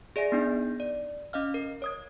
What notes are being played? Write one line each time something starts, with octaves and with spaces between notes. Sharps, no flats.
G#4 D5 E5 G#5 A#6
B3 D4 D#4 G6
D5
C#4 D#5 F5 F6
A#4
C#5 D#6 G#6